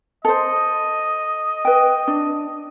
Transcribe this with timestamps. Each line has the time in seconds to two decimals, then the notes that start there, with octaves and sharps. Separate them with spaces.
0.25 A4 C5 D#5
1.65 B4 G5
2.07 D4